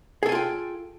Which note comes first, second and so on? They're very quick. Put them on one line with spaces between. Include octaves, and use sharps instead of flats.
G#4 A4 G#5 F4 G5